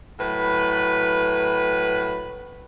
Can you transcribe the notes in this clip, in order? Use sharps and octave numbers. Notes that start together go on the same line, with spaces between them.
A2 F#3 B4